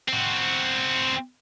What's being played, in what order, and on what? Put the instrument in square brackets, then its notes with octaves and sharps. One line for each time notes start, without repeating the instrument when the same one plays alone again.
[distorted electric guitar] C4 F#4